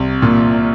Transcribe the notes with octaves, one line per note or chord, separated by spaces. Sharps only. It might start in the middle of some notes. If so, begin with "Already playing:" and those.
Already playing: C2
A#2